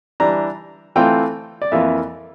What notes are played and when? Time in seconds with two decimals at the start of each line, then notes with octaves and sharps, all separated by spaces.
0.20 E3 G3 D4 A#5
0.96 E3 A3 C4 F4 G5
1.62 D5
1.72 F2 E3 A#3 F4 E5